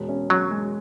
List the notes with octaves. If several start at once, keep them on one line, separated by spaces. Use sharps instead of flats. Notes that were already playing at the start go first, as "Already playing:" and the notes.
Already playing: E1 G#3
C#4
F#3 C#4
G#3